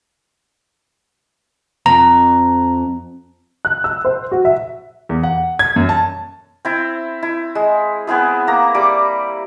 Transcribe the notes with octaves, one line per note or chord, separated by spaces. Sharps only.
F2 A#5
F#6
E6
C5
F#4
E5
E2
F#5
G#6
F#2
A5
C4 E4
E4
G#3
B3 C4 E4 G#4
A#3 A#5
G3 D6